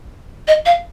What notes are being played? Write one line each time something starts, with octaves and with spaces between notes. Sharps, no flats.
D#5
F5